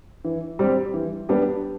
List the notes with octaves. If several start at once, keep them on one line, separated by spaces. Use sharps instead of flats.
E3
G3 C4 G4
E3
G3 B3 D4 G4